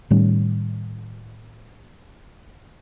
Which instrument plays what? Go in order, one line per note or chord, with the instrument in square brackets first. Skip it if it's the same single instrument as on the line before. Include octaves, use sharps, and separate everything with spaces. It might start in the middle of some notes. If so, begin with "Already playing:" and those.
[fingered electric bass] A2 D#3 G3 C#4